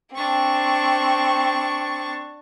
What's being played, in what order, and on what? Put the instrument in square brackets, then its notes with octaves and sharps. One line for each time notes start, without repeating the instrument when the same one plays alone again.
[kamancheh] C4 [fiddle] D4 C#6